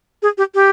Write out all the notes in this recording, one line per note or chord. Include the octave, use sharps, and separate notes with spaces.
G#4
G4
G4